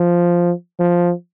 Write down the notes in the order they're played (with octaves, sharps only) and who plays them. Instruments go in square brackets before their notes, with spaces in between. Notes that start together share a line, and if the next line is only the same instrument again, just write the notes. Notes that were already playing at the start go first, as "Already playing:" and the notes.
Already playing: [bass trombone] F3
F3